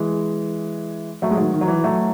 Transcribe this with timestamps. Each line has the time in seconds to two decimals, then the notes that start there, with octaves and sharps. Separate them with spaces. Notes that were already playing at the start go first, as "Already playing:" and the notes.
Already playing: E3 G#3
1.22 F#3 A3
1.31 G#3
1.37 D#3 F#3
1.54 D#3
1.61 F#3
1.68 E3
1.84 F#3 A3